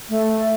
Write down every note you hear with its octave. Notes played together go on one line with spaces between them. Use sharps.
A3